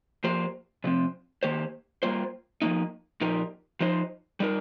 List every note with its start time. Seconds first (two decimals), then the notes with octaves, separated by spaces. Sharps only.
0.24 F3 A#3 G4 C5
0.84 C3 F3 C4
1.43 D#3 A#3 G4 C5
2.03 G3 A#3 F4 C5
2.62 F3 A#3 D#4
3.21 A#2 F3 D#4 G4 A#4
3.80 F3 D#4 C5
4.40 G3 D#4 A#4